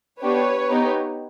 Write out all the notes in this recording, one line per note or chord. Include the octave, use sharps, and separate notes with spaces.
B3 D4 G4 B4 C#5
B3 D#4 G4